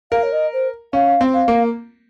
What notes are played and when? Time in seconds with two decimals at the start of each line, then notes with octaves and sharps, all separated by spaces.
0.11 A#4 F5
0.23 C#5
0.32 D#5
0.53 C5
0.93 C#4 F5
1.21 C4
1.34 F5
1.48 A#3